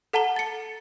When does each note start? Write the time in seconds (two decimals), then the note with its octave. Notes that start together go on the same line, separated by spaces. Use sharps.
0.13 A4 F#5 A5 A#5 G7
0.36 A6 C#7